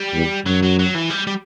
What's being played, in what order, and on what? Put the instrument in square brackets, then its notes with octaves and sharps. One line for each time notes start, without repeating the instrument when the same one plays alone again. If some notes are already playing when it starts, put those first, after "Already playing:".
Already playing: [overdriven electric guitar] G3
[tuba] E2
[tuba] F#2 [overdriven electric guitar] F#3
[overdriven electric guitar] F#3
F#3
E3
G3
G3